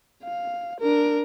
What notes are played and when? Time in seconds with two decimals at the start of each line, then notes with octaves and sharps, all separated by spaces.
0.23 F5
0.81 D4 A#4